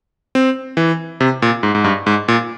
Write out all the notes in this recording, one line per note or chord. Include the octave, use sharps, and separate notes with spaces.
C4
E3
C3
A#2
G#2
G#2
G2
G#2
A#2